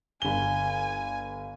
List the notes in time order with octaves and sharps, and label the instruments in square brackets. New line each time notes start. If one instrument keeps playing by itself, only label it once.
[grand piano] G1 G7 [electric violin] G#5